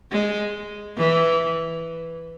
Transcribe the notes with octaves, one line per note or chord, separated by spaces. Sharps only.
G#3
E3